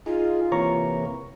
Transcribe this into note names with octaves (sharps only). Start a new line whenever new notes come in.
D#4 F4 G#4
C3 E3 A#3 C#5 A#5 C#6